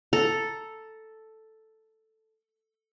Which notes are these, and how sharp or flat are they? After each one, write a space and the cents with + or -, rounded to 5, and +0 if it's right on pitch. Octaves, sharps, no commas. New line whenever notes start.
A4 +0 A#5 +0